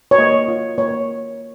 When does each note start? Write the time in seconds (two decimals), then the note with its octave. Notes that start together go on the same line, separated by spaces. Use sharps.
0.11 C#5
0.18 A#3 D#5
0.48 F4
0.78 A#3 C#5